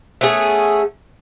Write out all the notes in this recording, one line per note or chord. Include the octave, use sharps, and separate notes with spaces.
A3 B3 C#4 G#4